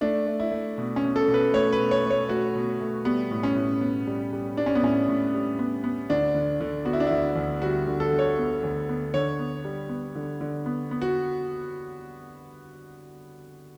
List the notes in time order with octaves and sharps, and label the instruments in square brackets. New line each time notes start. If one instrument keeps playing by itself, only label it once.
[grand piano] A3 D4
A3
E4
A3
B2
C#4
B2
A4
B2
B4
A3 C#5
B4
B2
C#5
A3
C#5
A3 F#4
B2
A3
G3 B3
A2
C#4
A2
B3
G3
G3
G3 D4
C#4
B3
A2 C#4
A2
G3
B3
B3
D2 D4
D3
D3
B3 F#4
E4
D4
D2 E4
D2
G3 F#4
D3
A4
D3
C#5
B3
D2
B3
D3 C#5
B3
G3
B3
D3
D3
B3
B3
F#4